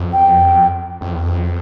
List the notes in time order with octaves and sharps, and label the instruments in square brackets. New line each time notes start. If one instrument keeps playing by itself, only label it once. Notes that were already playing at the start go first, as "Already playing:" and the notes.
Already playing: [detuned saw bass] F2
[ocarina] G5
[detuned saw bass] F2
E2
F2